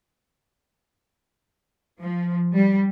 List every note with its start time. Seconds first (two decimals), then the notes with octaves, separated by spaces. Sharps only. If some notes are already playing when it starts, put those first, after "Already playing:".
2.01 F3
2.53 G3